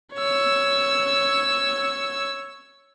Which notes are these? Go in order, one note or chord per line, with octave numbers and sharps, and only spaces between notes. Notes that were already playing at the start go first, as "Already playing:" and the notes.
C#5 E6